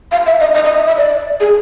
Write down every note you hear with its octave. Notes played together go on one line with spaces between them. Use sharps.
F5
E5
D#5
D#5
D#5
E5
E5
D5
G#4